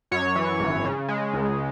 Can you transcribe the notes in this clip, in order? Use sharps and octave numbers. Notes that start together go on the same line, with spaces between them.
F#2 C#5
E3
G#1
C#3
G#3
C#2